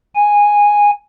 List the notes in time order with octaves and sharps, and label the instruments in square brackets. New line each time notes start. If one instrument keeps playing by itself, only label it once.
[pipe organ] G#5